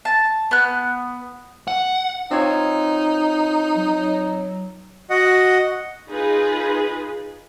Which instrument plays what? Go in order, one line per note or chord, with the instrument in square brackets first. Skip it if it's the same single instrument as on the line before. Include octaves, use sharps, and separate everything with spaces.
[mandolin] A5
B3 F#6
[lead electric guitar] F#5
[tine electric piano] C4 F4 C#5 [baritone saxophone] D#4
[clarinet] F#3
[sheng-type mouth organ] F#4 D#5 F#5
[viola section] D#4 F4 G#4 B4